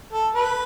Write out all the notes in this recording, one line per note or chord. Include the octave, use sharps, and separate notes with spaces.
A4
B4